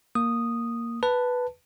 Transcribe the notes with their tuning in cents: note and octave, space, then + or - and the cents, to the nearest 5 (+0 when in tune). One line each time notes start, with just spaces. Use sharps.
A#3 +0 D#6 -5
B4 +0 A5 +10